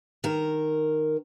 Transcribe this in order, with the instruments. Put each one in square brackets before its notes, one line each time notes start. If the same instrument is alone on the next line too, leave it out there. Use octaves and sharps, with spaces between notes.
[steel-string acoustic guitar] D#3 A#4